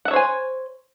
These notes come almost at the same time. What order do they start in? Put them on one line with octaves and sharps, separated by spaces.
F#5 E5 C#5 C5 G#5